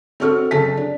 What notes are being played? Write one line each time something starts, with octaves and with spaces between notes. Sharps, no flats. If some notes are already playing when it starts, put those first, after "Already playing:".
C4 F#4 A4 C#6 F6
F#1 A4 A5 B6
D4